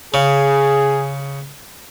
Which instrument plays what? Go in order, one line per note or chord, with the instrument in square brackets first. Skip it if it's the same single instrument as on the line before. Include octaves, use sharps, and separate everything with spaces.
[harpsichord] C#3 [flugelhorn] G#4